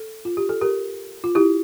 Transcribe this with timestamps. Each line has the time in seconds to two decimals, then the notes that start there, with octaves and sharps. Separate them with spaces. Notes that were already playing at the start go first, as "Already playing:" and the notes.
Already playing: A4
0.25 F4
0.37 G4
0.49 A4
0.61 G4 A#4
1.24 F4
1.35 E4 G4